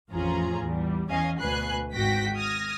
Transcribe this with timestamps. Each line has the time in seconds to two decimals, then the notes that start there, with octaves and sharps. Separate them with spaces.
0.11 A1 F2 C#4 F4 G#4 A#5
0.62 E2 G3
1.09 E2 E3 C#4 D#5 F5 G#5
1.40 D2 B2 B4 G#5 F#6 C7
1.93 G#1 G#2 F#4 G5 A#6 B6
2.37 D#6 F6 G#6 A#6